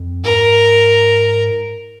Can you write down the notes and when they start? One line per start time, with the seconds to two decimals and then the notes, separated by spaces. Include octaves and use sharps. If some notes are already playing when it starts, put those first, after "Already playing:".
Already playing: F2
0.24 G#2 A#4